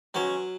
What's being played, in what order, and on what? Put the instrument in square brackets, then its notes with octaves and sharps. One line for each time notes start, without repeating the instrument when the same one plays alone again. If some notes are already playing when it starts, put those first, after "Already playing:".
[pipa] B2 G#3 C#4 [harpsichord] F#3